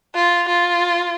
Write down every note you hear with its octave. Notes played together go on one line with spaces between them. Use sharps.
F4
F4